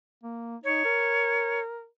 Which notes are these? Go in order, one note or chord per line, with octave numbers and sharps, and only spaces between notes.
A#3
D#4 C#5
A#4